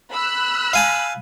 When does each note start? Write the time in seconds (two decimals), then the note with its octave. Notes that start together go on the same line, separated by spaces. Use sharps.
0.11 B5 E6 F#6
0.73 F5 G#5 A5